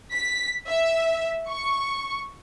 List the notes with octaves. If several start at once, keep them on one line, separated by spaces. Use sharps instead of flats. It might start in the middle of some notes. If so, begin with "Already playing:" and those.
B6
E5
C#6